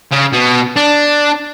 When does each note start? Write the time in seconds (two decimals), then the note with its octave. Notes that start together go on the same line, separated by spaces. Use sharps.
0.11 C#3
0.32 B2
0.76 D4